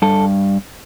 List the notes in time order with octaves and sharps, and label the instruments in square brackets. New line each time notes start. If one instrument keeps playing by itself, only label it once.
[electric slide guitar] G2 A4